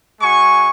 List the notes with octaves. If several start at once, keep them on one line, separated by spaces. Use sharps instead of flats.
G#3 F#4 G#5 C#6